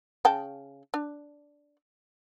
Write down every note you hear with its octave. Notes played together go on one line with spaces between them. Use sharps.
C#3 G5 A5
D4